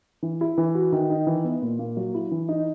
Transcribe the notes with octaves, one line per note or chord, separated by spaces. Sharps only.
E3
E4
E3
F#4
D#3
D#4
E3
B3
A#2
A#3
F#3
E4
E3
D#4